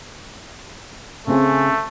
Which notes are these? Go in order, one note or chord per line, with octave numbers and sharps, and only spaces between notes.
C#3 A3 C4 G#4